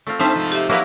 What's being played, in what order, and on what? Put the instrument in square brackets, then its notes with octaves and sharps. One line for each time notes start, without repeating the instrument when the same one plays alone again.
[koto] A3 C4 F4
[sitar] G2 C4 E5 [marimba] D#4 A5 C6 [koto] C5
[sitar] G#2 C3 F3
[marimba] G4 E5
[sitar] F3 D#4 B4 [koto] F#3 A#3 E4 [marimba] E5 F5